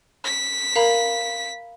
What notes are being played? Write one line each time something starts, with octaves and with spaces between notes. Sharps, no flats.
B6
A#4 F5 A#5 B5